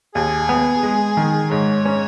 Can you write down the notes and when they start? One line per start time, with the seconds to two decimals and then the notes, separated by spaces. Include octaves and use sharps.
0.15 D#2 G#4
0.49 B3
0.83 G#3
1.17 D#3
1.51 G#2 C#5
1.85 C#4